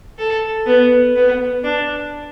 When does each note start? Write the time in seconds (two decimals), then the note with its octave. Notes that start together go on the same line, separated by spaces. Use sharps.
0.18 A4
0.66 B3
1.15 B3
1.64 D4